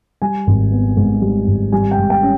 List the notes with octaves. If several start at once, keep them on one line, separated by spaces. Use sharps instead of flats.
G3 G#5
G#1
B3
G#2
G3
G#1
G3 G#5
G5
G#2
G5
C#4